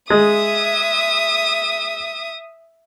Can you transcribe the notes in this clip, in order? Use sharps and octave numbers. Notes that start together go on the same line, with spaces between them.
G#3 E5 D#6